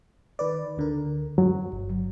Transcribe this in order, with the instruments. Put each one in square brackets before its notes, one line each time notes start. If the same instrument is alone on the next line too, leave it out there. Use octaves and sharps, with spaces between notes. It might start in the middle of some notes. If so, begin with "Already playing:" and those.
[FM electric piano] D#3 B4 D5
D2 D3 A#4
[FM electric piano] F#2 [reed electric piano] F#3
[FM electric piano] G1